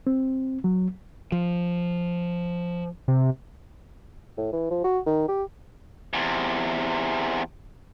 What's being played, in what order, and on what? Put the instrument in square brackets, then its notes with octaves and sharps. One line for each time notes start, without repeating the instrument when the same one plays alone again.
[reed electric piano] C4
F#3
[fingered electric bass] F3
[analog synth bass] C3
[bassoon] A2
E3
F3
F#4
D#3
G4
[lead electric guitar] E2 C3